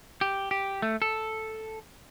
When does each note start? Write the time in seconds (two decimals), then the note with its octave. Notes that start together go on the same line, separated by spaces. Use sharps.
0.21 G4
0.51 G4
0.82 A3
1.02 A4